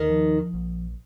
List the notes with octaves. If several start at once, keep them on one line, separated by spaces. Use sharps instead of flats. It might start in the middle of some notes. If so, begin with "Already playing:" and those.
Already playing: D#2 D#3
F3
A#1